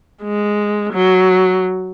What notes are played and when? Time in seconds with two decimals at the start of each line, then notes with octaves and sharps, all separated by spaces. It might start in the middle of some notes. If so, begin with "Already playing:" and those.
0.23 G#3
0.94 F#3